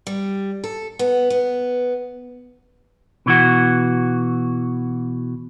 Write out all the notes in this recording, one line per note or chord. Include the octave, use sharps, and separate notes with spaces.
G3
A4
B3
B3
B2 E3 F#4